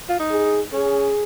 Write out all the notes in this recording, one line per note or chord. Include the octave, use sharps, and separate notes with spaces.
F4
D#4
G#4
C#4 G#4